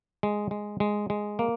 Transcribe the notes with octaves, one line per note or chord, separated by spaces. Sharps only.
G#3
G#3
G#3
G#3
A#3